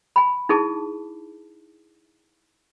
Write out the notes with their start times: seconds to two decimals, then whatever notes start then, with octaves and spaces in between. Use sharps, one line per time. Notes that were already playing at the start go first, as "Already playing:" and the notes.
0.16 G#5 B5
0.49 D#4 E4 G#4 A5 D6